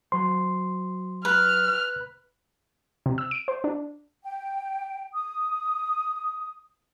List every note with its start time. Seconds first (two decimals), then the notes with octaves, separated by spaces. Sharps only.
0.12 F#3 C5 C6
1.25 B4 F6
3.06 C3
3.18 E6
3.31 D7
3.48 C5
3.64 D4
4.24 G5
5.14 D#6